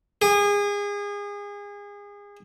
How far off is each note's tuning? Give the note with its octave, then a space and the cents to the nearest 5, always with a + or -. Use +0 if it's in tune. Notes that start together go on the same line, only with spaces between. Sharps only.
G#4 -30